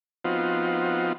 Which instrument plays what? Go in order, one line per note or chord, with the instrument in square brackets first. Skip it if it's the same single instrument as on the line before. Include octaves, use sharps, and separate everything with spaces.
[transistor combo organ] F3 B3 C4 D#4 F4 F#4